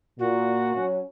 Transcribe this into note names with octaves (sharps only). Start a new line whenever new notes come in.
A#2 F#4
F#3 C#4